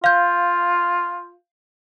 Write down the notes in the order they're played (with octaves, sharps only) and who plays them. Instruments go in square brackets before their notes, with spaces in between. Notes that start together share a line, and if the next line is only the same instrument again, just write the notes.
[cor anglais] F4 [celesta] F5 G6